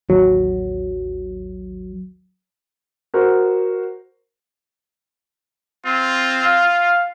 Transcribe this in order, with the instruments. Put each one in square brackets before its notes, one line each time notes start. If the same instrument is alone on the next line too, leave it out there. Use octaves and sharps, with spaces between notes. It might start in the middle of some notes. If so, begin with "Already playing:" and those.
[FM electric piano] A1 D#2 F#3
[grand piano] F#4 A#4 C5
[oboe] C4 [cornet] F4
[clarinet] F5